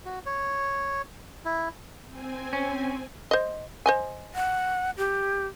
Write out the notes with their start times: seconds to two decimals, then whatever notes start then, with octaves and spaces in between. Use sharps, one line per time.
0.05 F#4
0.26 C#5
1.45 E4
2.08 C4 G#5
2.53 C#4
3.31 C5 D#5
3.86 C5 D#5 G#5
4.35 F#5
4.98 G4